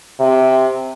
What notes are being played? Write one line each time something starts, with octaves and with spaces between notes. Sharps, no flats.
C3